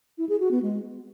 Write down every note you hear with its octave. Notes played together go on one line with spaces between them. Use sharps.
E4
G#4
F#4
B3
G#3